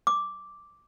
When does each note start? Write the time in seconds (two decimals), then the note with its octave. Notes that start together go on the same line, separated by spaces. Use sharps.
0.07 D6